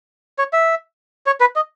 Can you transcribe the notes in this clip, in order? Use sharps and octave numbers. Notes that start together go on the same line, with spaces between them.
C#5
E5
C#5
B4
D#5